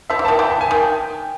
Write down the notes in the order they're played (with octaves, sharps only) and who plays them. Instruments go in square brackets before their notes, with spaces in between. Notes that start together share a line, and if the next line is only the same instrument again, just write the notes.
[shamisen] F3 [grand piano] E5
[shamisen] E3
[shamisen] D#3 [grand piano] A5
[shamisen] E3 [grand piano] G5
[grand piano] A5
G#5
[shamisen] D#3 [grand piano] G5